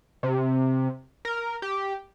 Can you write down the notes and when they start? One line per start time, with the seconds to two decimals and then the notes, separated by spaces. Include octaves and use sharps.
0.23 C3
1.25 A#4
1.62 G4